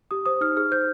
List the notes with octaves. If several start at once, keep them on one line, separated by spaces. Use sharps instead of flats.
G4 D#6
C5 D#6
D#4 F6
G#4 F6
C5 G6